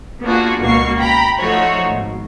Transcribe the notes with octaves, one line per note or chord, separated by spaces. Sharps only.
A#3 B3 D4 F4 F#4 G#4
C#2 B2 A#3 C#6 C7
G5 A#5 B5
F3 A3 D#4 F4 F#4 C#5
G#1 B2